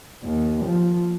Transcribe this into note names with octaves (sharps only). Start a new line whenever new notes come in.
D#2
F3